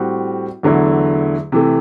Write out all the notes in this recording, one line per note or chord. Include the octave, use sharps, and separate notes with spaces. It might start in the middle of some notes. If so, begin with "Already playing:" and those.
Already playing: A2 G3 C4 F#4
E2 D3 F#3 A3 E4
C3 E3 A3